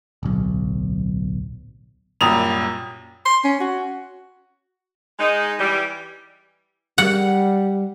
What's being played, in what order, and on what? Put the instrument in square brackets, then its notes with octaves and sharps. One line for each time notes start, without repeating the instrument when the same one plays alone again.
[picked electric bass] D1 B1
[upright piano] C2 F#2 A#2 G3 D#6 F7
[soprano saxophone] C6
C#4
F#4
[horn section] G#3 D#4
E3 G3
[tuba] G3 [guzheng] F#5